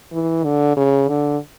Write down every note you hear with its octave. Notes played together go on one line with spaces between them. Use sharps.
E3
D3
C#3
D3